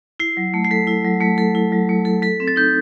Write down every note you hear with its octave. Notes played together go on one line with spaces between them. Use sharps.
E4 C7
F#3
A3
C7
A4 B6
E4
F#3
A3 B6
A4
E4
F#3
A3
A4
A4 B6
C4
A6
D#4 G6